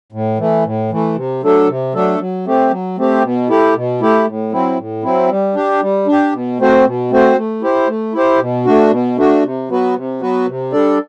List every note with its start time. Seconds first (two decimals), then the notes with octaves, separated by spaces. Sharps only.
0.12 A2
0.38 E3 A3
0.65 A2
0.90 E3 A3
1.16 C3
1.43 F#3 A3 D4 A4
1.68 C3
1.94 F#3 A3 D4 A4
2.19 F#3
2.45 A3 C4 G4
2.71 F#3
2.97 A3 C4 G4
3.23 B2
3.49 A3 E4 G4
3.75 B2
4.01 A3 E4 G4
4.27 A2
4.52 F#3 C4 E4
4.78 A2
5.03 F#3 C4 E4
5.29 G3
5.55 D4 G4
5.81 G3
6.07 D4 G4
6.32 B2
6.59 A3 C4 F#4 C5
6.85 B2
7.11 A3 C4 F#4 C5
7.37 A3
7.62 E4 G4 C5
7.88 A3
8.14 E4 G4 C5
8.40 B2
8.65 A3 D4 F#4
8.91 B2
9.17 A3 D4 F#4
9.43 C3
9.69 F#3 B3 F#4 B4
9.95 C3
10.21 F#3 B3 F#4 B4
10.47 C3
10.72 G3 D4 A4 D5